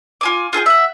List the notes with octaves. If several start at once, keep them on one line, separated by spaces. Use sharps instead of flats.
F4 G#5 D6
F4 G#4 A4 G5
E5 F#5